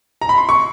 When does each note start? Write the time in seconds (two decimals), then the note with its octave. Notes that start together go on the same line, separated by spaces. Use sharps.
0.22 A#5
0.29 B5
0.38 C6
0.49 C#6